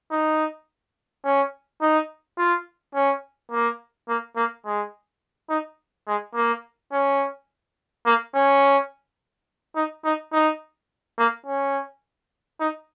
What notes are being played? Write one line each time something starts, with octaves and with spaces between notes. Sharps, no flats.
D#4
C#4
D#4
F4
C#4
A#3
A#3
A#3
G#3
D#4
G#3
A#3
C#4
A#3
C#4
D#4
D#4
D#4
A#3
C#4
D#4